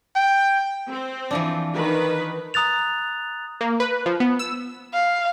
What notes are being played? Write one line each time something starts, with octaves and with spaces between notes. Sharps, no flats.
G5
C4
E3 F3 D4
D#3 B4
A#5 D#6 F#6 A6 F7
A#3
B4
F3
B3
E6
F5